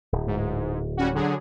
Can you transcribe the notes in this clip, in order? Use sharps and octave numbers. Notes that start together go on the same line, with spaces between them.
D1
G#2
G3 C#4 F#4
D3 F#3 G#4